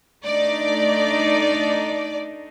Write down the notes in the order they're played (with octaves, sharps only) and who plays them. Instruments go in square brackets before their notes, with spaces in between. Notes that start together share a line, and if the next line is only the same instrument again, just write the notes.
[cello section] A3 D4 D#4 [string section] D5